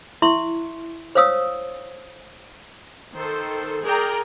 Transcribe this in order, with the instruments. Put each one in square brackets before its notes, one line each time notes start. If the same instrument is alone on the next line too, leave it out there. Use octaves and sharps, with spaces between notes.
[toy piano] E4 E5 C6 C#6
C5 C#5 F5 D#6 E6
[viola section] D#3 A4 C5
G#4 A#4 D5 G5 A#5